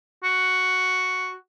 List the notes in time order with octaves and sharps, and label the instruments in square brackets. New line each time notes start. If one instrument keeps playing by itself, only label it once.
[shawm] F#4